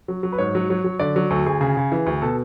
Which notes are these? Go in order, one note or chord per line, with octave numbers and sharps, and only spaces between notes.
F#3
F#3
B4
G#2 C#5
F#3
F#3
F#3
D3 D5
F#3
D2 A4
D2 G#4
C#3 G#4
C#3
E3
D2
B2 A4